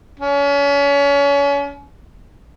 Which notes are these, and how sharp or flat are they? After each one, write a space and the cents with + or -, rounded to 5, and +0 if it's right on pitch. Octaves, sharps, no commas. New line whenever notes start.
C#4 +35